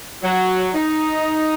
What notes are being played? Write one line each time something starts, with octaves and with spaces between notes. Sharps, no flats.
F#3
D#4